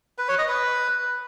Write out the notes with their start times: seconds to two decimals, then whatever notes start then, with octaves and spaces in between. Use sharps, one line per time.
0.18 B4
0.28 C#5
0.38 D#5
0.48 B4